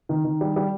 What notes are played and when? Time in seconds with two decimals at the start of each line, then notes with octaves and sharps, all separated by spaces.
0.09 D#3
0.24 D#3
0.41 G3
0.56 G3